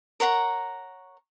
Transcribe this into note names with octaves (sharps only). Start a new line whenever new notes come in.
A#4 C#5 F#5 A#5